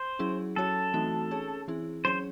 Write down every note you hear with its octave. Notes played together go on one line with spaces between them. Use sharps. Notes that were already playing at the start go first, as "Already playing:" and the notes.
Already playing: C5
F#3 C#4 E4 G#4
F#3 C#4 F#4 A4 C#5
E3 A3 C4 D#4 F#4
C#4 G#4 C#5
E3 C4 E4 G#4
F#3 C#4 G#4 C5 C#5